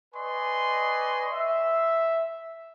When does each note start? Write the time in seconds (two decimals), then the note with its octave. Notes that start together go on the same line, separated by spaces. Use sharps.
0.15 B4 D5 D#5 G#5 C6 C#6
1.32 E5